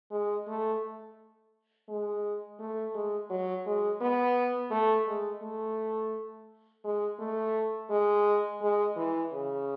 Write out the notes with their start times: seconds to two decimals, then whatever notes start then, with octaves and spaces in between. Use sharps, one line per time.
0.11 G#3
0.48 A3
1.89 G#3
2.60 A3
2.94 G#3
3.30 F#3
3.66 G#3
4.01 B3
4.71 A3
5.07 G#3
5.42 A3
6.84 G#3
7.19 A3
7.90 G#3
8.61 G#3
8.96 E3
9.32 C#3